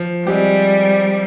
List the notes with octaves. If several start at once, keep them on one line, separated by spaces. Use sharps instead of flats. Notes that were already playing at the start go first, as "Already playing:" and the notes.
Already playing: F3
G3 G#3 C4 G4